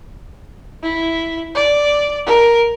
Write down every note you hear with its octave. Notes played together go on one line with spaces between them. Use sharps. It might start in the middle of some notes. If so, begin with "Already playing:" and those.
E4
D5
A#4